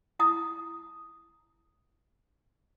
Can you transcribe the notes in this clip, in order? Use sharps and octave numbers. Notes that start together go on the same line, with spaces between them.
D#4 E4 A#5 D#6